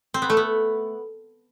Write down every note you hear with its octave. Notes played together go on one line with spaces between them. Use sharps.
C4
B3
A3
B3